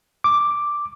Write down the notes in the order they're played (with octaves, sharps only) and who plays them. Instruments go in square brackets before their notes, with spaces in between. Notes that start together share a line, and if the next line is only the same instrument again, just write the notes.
[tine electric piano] D6